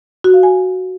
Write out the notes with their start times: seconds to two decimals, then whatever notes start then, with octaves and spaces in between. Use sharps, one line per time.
0.24 F#4
0.34 F5
0.43 G#5